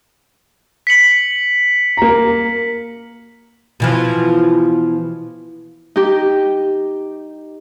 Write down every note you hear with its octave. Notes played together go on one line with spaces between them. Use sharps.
B6 C#7 F#7
A#3 A#5
B2 E3 F3
D#4 G4